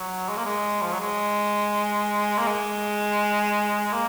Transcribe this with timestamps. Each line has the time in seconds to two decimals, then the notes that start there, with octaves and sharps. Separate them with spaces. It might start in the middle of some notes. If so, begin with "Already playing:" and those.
Already playing: F#3
0.28 G#3
0.37 A#3
0.45 G#3
0.81 F3
0.92 F#3
1.00 G#3
2.37 A#3
2.47 G#3
3.92 A#3